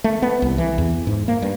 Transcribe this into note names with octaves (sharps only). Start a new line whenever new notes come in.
A3
B3
C2
E3
E2
G#2
A#3
G2